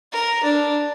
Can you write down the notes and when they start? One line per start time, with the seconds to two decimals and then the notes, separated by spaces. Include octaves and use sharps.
0.12 A#4
0.43 D4